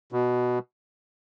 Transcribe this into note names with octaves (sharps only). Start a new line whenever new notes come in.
B2